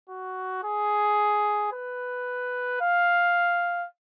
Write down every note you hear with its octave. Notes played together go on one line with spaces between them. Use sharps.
F#4
G#4
B4
F5